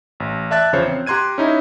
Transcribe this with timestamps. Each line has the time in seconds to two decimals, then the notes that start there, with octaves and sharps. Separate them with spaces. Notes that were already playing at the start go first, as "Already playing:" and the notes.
0.20 A1
0.51 D5 E5 A5 F#6 A6
0.73 E2 C#3 F3 C5 C#5
0.87 C4
1.07 G4 A#5 C6 F#6 G#6 D#7
1.38 C#4 D#4 E4